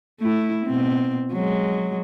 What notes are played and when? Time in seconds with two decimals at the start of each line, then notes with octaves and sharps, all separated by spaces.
0.20 A3 E4
0.66 B2 C4
1.33 F#3 G#3